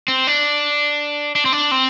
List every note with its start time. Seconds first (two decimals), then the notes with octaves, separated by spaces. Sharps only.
0.08 C4
0.27 D4
1.36 D4
1.46 C4
1.53 D4
1.71 C4